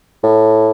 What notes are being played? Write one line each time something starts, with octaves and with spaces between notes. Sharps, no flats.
A2